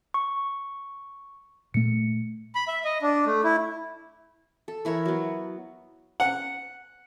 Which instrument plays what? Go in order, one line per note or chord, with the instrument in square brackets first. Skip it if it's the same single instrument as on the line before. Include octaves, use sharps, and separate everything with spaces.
[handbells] C#6
[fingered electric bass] A#2 A3 [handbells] C#7
[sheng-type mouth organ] B5
E5
D#5
D4
A3
E4
[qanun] A4
E3 E4 A#4 C#5
F#3 B3
[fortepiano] F#5